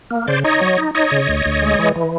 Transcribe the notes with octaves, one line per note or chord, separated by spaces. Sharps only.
A#3
C#3 C5 D5
D#4 C#5 D#5
F#3
D#4
D#4 C#5 D#5
C#3
D2
D2
G#3
E3
E3